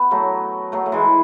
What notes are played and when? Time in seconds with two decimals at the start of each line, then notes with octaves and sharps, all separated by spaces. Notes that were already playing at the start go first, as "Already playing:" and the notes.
Already playing: B3
0.11 F#3 A3
0.72 F#3 A3
0.86 A3
0.92 E3 G#3